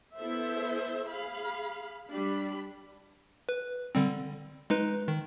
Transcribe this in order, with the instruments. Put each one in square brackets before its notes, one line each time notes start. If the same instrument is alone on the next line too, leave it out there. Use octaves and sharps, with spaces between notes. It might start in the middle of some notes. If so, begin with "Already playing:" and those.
[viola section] B3 E4 A4 C5 E5
G#4 F5 B5
G3 D4 B5
[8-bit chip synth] B4
D3 G3 C4
G#3 D#4 B4
D#3